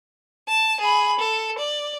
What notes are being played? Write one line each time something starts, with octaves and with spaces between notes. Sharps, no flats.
A5
G#4 B5
A4
D5